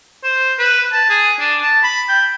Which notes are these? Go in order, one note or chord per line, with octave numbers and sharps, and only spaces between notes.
C5
B4
A5
G#4
D4
A5
B5
G5